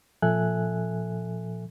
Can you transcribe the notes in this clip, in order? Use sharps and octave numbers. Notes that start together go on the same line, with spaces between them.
A#2 F3 A4 E5 G#5 F#6